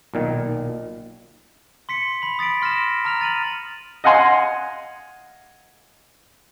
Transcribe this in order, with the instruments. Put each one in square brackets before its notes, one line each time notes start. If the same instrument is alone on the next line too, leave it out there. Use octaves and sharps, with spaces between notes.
[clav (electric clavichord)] B1 A#2 D#3
[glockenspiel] C6 B6 C#7
B5 F#7
D#6 A6 B6 D7
C6 F6 A#6 D7 E7
A#5 F6 F7
A6 D#7 F#7
[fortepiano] D#5 F5 F#5 G#5 C6